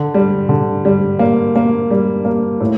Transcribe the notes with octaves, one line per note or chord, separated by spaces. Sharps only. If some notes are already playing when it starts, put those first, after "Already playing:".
Already playing: D3
G3
D3
G3
A#3
A#3
G3
A#3
A2